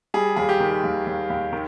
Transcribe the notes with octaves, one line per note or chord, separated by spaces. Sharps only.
G3 G#4
D#2 G#4
G4
D#3
D#2
D#2
D#2
D#3